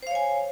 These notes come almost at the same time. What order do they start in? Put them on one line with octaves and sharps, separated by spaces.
C5 F5 C#5 G#5